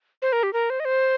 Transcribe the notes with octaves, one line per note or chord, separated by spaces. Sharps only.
C5
A#4
G4
A#4
C5
D#5
C5